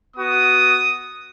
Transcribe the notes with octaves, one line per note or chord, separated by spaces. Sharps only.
B3 F#4 D#6